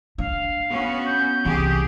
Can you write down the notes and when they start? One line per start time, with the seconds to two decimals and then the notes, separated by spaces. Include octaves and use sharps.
0.18 D4 F5
0.68 B3 C#4 F#4
1.06 G6
1.45 C2 E3 G4 G#4